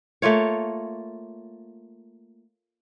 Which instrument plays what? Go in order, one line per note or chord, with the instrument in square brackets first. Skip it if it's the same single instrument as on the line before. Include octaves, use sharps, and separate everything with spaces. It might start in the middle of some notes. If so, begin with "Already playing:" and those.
[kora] A3 A#3 F4 C#5